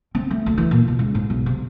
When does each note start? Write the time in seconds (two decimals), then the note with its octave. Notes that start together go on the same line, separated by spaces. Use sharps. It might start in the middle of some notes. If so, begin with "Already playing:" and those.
0.15 C4
0.31 A3
0.46 D2
0.58 E3
0.71 A#2
0.88 B2
0.99 C#2
1.15 G#2
1.30 B1
1.46 C3